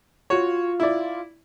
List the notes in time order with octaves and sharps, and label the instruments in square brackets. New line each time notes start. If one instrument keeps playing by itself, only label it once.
[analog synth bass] F4 [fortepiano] F#4 C#5
[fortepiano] E4 D5